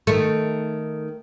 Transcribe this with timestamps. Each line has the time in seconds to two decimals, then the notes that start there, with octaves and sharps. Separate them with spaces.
0.07 D#3 A3